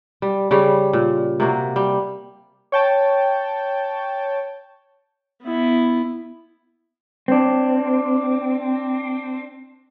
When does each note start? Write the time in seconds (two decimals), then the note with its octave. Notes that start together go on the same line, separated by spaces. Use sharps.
0.22 G3
0.51 C#3 G3 C#5
0.93 A#2
1.40 C3 A#3 F#4
1.76 G3
2.72 C#5 G5 A5
5.42 B3 E4
7.28 C4 D4